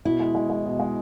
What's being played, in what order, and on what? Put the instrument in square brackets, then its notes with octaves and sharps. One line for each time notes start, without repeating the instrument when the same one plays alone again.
[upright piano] B2 [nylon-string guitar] E4
[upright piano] G#3
G#3
G#3
B2
G#3